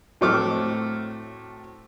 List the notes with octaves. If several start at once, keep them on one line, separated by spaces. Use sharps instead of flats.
A2 F#3 A3 C4 D6 F6